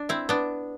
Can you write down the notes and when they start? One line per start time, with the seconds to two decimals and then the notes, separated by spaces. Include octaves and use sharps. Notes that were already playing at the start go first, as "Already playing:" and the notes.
Already playing: D4
0.09 C4 E4
0.29 B3 D4